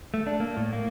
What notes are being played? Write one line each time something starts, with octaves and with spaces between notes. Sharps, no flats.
A3
D4
A#3
A2
A#3